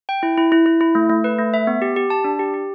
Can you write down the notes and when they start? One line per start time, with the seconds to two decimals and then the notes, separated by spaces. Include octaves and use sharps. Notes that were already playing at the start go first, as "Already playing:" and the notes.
0.09 G5
0.23 E4
0.37 E4
0.52 E4
0.66 E4
0.81 E4
0.95 A3
1.10 A3
1.24 B4
1.39 A3
1.54 E5
1.67 B3
1.82 G4
1.96 G4
2.10 A5
2.24 D4
2.39 G4
2.54 G4